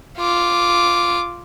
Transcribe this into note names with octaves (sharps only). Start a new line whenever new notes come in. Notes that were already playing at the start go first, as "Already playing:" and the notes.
F4 D6